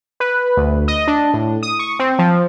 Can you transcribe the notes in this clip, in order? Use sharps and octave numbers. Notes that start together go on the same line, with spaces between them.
B4
D2
D#5
D4
A2
D#6
C#6
C4
F3